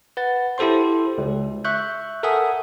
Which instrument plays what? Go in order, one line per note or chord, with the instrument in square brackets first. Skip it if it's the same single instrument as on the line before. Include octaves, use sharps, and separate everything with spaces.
[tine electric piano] B4 F#5 A6
E4 G4 A4 C5 C6
C#2
E5 C#6 F#6 G6
A4 A#4 E5 F#5 G#5 D#6